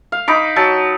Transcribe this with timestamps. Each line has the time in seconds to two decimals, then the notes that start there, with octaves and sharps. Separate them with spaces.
0.12 F5
0.28 D#4 B5 D6
0.56 F#3 A5